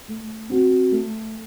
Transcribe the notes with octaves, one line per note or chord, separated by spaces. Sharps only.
A3
C4 F#4
A3